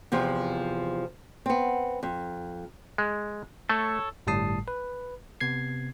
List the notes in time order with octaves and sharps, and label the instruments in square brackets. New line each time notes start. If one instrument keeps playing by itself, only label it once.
[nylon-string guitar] E2 C3 F3
B3 C4
F2
[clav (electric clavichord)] G#3
[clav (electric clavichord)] A3 [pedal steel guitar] A4 C#5
[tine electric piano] G1 A2 G3 A5 D#6 C7
B4
C3 B3 G#6 C7